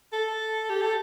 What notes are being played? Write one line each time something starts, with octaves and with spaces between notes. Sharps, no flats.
A4
G4
A4